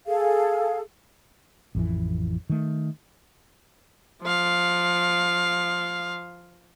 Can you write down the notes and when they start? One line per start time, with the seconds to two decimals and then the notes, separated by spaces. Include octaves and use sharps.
0.07 G#4 A4 F5
1.75 A1 F2 E3
2.50 D#3 A3
4.22 F3 F5